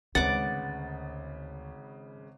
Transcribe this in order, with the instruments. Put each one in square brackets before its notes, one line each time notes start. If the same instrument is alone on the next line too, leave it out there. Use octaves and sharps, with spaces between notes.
[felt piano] G#1 C#3 B4 [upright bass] D2 G#3 [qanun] F#5 D6 [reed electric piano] A6